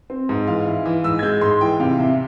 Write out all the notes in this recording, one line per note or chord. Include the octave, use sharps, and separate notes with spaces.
C4
G#2
E3 F5
E4
E3
G#2 E6
G#6
G#3 G6
G#2 C6
E3 G5
C3 F5
C3 E5